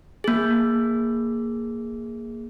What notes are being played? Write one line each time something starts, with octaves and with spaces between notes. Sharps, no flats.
A#3 G#4